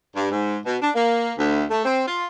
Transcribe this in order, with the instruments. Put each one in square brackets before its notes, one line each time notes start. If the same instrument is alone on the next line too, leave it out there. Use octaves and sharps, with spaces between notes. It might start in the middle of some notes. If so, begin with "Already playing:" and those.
[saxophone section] G2
G#2
B2
D4
A#3
D2
A3
C4
F4